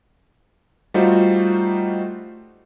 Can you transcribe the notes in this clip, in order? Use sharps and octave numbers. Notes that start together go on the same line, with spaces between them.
G3 A3 D#4 F4 F#4 C5